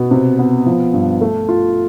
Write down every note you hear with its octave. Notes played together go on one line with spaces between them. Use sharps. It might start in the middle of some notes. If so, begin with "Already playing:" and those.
Already playing: B2 B3
C3
B3
F3
G2
A3
F4